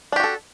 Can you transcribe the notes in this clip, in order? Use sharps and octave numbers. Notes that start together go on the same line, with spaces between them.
D4 F#4 G4 A4